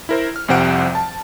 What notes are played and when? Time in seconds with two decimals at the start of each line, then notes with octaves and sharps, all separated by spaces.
0.09 E4 A#4 C5
0.36 F6
0.48 C2 F2 C3 C5 F#5 D7
0.95 A5